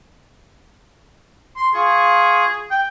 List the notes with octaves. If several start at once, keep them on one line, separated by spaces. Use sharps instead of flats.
C6
F4 G#4 C#6
G5